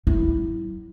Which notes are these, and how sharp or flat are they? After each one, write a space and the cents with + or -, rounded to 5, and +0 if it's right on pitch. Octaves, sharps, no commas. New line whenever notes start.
F#3 +20 E4 +0